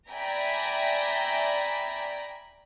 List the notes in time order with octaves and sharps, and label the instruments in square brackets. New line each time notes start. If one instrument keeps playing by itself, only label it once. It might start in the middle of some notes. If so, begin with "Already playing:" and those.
[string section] D5 E5 G5 G#5 A#5 B5